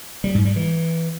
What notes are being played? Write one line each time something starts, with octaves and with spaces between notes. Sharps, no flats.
G3
G#2
G3
E3